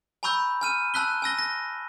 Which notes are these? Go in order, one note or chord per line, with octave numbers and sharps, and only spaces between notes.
G#5 A#5 B5 C#6 E6 G6
G#5 F6 D#7
A5 E6 F#6 B6 G7
G#5 E6 A#6 G7
A#6